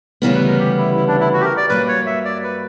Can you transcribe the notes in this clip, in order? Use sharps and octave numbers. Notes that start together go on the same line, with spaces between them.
D2 C#3 E3 G3 B3 A#4
B4
A#4
G4
E4
E4
D4
E4
F#4
G4
A#4
D5
G2 F#3 A#3 B4
C#5
E5
D5
B4